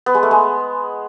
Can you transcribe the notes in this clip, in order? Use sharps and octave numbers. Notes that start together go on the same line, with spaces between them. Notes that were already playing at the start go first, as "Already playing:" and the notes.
B3
G#3
A3
G#3